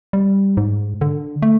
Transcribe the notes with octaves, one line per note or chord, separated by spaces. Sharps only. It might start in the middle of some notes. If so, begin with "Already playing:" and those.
G3
G#2
D3
A3